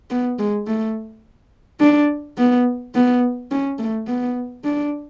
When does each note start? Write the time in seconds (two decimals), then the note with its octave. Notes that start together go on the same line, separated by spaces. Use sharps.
0.10 B3
0.38 G#3
0.66 A3
1.80 D4
2.38 B3
2.95 B3
3.51 C#4
3.79 A3
4.07 B3
4.64 D4